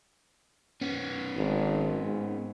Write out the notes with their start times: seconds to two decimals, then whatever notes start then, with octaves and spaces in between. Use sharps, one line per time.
0.81 B3 C#4
1.37 G#1
2.05 G#2